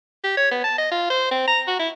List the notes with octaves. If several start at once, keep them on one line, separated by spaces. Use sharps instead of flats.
G4
C#5
B3
A5
D#5
F4
C5
C4
A#5
F#4
E4